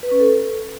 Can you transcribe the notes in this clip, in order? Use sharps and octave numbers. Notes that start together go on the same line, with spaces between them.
B4
C#4
A4